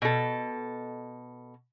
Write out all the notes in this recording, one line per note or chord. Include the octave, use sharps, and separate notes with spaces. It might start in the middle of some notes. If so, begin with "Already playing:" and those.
B2 A4